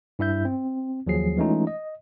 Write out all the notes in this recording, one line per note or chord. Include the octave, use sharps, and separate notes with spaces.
G2 E4 E5 G6
C4
D#2 F3 F#3 G#4 C7
E3 G#3 A3 C#4 D#4 F4
D#5